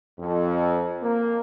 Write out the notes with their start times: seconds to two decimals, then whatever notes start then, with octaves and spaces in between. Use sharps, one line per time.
0.19 F2
1.02 A#3